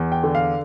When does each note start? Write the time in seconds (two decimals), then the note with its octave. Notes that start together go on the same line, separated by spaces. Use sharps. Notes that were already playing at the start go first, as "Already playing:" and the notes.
Already playing: E2
0.12 G5
0.24 D3
0.35 F5